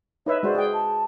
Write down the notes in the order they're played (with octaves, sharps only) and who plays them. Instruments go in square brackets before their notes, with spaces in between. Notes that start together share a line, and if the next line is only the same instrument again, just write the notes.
[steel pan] D#4 B4 E5 [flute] C#5
[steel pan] G#3 F#4 C5 [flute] D5
[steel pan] G#4 G5
[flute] A5